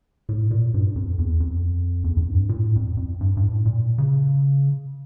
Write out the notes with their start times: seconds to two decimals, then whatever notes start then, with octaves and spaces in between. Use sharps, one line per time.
0.29 A2
0.51 A#2
0.74 G2
0.96 F2
1.19 E2
1.40 F2
2.04 E2
2.17 F2
2.30 G2
2.49 A#2
2.53 A2
2.76 F2
2.97 F2
3.21 G2
3.37 G2
3.43 A2
3.65 A#2
3.98 C#3